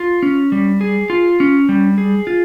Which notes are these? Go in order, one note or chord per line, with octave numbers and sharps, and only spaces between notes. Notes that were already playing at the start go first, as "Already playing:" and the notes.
Already playing: F4
C#4
G3
G#4
F4
C#4
G3
G#4
F4